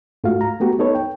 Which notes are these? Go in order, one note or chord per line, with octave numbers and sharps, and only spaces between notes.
G#2 A3 F4 F#4 F5
A#5
A3 B3 F#4 G4
B3 D#4 A4 B4 C#5
G5